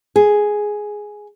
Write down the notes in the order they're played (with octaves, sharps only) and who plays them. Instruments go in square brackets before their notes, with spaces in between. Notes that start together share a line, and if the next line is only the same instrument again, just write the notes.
[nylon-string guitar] G#4